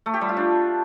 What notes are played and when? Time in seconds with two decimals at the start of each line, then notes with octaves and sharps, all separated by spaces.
0.06 A3
0.14 G4
0.21 G3
0.29 F4
0.37 D4